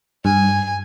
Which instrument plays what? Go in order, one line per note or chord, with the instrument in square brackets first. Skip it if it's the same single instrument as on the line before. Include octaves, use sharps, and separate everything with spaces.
[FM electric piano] G2 [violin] G#5